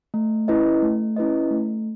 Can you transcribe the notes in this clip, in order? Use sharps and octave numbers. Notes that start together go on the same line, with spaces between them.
A3
C#4 E4 B4 D#5
A3
C#4 E4 B4 D#5
A3